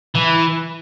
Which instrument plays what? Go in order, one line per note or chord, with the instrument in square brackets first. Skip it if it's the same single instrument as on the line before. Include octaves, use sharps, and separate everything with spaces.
[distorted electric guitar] E3